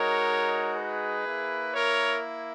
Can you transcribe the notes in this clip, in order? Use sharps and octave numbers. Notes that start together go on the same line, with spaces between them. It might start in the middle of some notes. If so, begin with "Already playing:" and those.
Already playing: G#3 D#4 F#4 A#4 C#5
G#4 B4
A#3 E4
A#4 C#5